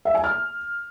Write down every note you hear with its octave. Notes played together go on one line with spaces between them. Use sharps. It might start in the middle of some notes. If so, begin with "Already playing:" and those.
E5
G#5
F6